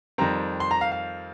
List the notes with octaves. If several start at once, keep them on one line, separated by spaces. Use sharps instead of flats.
F2 D#3 G3 C4 A#5
C6
A#5
F5
F5